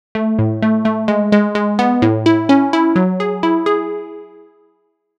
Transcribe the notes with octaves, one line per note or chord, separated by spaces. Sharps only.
A3
A2
A3
A3
G#3
G#3
G#3
B3
A2
E4
C#4
E4
F#3
G#4
E4
G#4